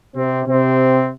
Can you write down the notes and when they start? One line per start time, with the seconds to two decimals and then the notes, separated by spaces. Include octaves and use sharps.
0.15 C3 C4
0.46 C3 C4